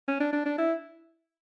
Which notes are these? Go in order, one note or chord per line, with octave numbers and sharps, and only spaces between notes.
C#4
D4
D4
D4
E4